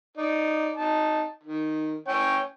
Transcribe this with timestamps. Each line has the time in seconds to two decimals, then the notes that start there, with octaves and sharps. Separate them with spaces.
0.17 D#4 D5
0.76 D#4 A5
1.43 D#3
2.08 C#4 C#5 G5